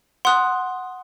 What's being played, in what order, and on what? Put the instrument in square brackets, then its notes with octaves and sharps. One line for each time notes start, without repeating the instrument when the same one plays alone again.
[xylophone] F#5 C6 D#6 F#6